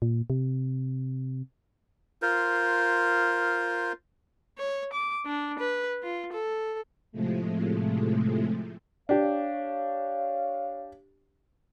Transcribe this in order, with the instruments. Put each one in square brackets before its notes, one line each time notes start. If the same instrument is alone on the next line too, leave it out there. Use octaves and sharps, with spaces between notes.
[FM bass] A#2
C3
[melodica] F4 A#4 C5
[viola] C#5
D6
D4
B4
F4
A4
[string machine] A2 C3 F3 G#3 A3
[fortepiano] D4 G4 [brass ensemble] C#5 F5